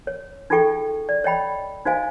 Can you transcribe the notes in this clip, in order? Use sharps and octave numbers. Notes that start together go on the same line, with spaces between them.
C#5
D#4 F4 G#4 A4 G5 C#6
D5
C#5 D#5 G5 B5
D#4 F#4 C5 D#5 F5 G#5